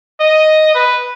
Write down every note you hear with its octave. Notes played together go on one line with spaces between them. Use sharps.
D#5
B4